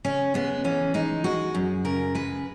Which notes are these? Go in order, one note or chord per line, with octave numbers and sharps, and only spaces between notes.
C#3 C#4
G#3 B3
E3 C#4
G#3 D#4
G#3 F#4
F#2
C#3 A#4
G#3 B4